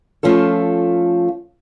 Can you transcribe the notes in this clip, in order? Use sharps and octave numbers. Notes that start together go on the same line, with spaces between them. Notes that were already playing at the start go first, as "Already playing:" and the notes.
F3 A3 C#4 F4 A4